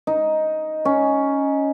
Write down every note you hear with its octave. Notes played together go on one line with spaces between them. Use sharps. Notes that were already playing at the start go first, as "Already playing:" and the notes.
D#4
C#4